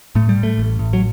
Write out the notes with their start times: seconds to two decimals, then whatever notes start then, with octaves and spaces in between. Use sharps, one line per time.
0.15 A2 A3
0.29 G3
0.37 A2
0.43 A3
0.58 A1
0.79 A2
0.93 F#3